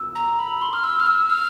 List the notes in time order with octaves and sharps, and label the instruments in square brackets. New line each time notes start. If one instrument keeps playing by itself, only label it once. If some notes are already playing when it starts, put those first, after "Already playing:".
Already playing: [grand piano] E6
[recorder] A#5
B5
C6
F6
E6
F6
E6
F6